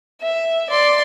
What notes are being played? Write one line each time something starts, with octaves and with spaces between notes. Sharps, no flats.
E5
D5 C6